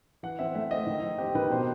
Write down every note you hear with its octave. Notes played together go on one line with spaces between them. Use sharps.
E3 F#5
C4 E5
A3 E5
C4 D#5
D#3
D#3
C4 G4
D#3 B4
B2 C5